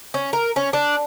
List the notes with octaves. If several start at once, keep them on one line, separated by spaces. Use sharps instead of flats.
C#4
A#4
C#4
D4